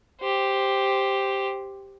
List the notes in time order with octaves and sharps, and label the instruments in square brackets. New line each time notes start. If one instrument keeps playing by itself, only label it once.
[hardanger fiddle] G4 C5